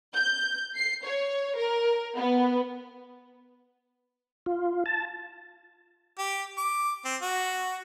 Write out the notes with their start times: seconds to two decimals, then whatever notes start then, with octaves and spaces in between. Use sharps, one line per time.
0.14 G6
0.76 C7
1.06 C#5
1.57 A#4
2.16 B3
4.46 F4
4.86 A5
6.18 G4
6.57 D6
7.05 C4
7.22 F#4